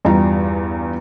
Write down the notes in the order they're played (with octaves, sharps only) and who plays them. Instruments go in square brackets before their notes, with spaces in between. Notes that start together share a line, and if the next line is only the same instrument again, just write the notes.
[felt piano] E2 G2 G3 F4 A#5